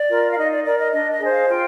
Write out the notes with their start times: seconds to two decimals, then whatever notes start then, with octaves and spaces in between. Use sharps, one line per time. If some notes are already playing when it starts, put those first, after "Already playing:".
Already playing: D5
0.09 F4 A#4
0.30 F5
0.38 D#4 D#5
0.51 D5
0.65 A#4 D5
0.78 D#5
0.92 D4 D#5
1.12 D#5
1.20 G#4 C5
1.29 F5
1.48 F4 G5